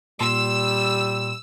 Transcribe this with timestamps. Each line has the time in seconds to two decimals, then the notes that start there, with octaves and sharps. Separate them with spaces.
0.21 A#2 G3 C6 E6